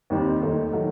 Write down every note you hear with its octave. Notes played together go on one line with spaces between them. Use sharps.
D#2 D#3 G3 C4
D#2 D#3 A3
D#3 F#3 A3